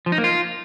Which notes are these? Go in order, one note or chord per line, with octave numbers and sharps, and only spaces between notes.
F3
D#4
A#3
F4